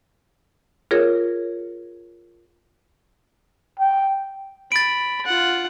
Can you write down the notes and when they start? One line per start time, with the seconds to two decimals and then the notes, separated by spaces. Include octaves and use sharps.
0.91 F4 G#4 A#4 C#5
3.80 G5
4.72 B5 A6 D7
5.26 F4 F#5